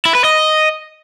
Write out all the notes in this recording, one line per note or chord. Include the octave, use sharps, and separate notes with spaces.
E4
B4
D#5